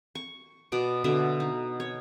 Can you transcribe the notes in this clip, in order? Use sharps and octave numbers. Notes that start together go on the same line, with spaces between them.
C#6
B2 B3 D5
B2 D3 E5
D#4
C#5